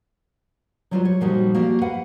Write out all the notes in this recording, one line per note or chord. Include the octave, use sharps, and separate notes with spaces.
F#3 G3 F4 F#4 B4 D5
C#5
A#2 F3 G3 D#4 F#4
A#3 F#4 G4 D5
B4 F5 F#5